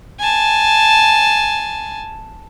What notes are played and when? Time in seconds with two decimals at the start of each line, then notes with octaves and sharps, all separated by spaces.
0.20 G#5 A5